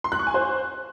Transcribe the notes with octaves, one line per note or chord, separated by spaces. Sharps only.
C6
F#6
C#6
G#5
C5